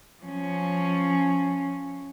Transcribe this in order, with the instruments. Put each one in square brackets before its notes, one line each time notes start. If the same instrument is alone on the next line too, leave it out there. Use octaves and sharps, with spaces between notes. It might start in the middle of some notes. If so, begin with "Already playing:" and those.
[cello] F3 C#4